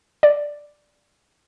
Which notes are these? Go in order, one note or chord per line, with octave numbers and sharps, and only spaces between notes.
D5